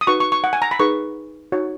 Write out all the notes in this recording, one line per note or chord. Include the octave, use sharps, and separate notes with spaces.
D#6
D#4 F#4 B4 C#6
C#6
C#6
F#5
G#5
A#5
B5
D#4 G#4 B4 C#6
D#4 F#4 C#5